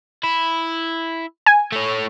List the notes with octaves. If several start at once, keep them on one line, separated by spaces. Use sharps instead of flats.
E4
G#5
A3 C#5